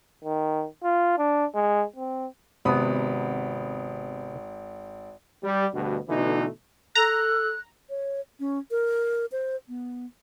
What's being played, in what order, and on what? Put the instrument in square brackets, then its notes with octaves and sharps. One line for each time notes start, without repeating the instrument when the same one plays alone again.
[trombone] D#3
F4
D4
G#3
C4
[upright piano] G#1 B5 D#6 [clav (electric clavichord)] C3 B3
[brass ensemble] G3
D2 G2 B2
B2 D3 E3 A3 D#4
[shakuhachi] A4 [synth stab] A#5 [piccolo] F#6
[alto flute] C#5
C#4
A#4
C5
B3